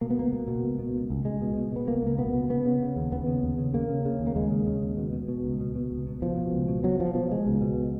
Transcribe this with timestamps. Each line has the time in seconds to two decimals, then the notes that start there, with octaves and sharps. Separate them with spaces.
0.01 B2 A#3
0.10 B3
0.17 C#2 A#3
0.33 B2
0.48 B2
0.63 C#2
0.79 B2
0.94 C#2
1.10 C#2
1.25 C#2 G#3
1.42 B2
1.56 B2
1.72 B2 B3
1.88 C#2 A#3
2.03 C#2 A#3
2.18 B2 B3
2.34 B2
2.49 C#3 B3
2.66 C#3
2.80 C#3
2.96 D#2
3.12 D#2 B3
3.27 C#3
3.43 D#2
3.58 C#3
3.74 C#3 A#3
3.89 C#3
4.05 C#3
4.20 D#2
4.27 A#3
4.36 D#2 G#3
4.51 C#3
4.66 C#3
4.82 D#2
4.97 B2
5.13 B2
5.28 B2
5.44 C#2
5.61 B2
5.76 B2
5.90 C#2
6.07 B2
6.22 B2 F3
6.37 B2
6.52 C#2
6.68 B2
6.84 B2 F#3
7.00 B2 F3
7.14 B2 F3
7.31 B2 G#3
7.46 C#2
7.61 B2